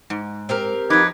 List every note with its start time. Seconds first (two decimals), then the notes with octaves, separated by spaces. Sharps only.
0.10 G#2
0.49 C4 G4 A#4
0.90 F2 D#4 B4 D6 G#6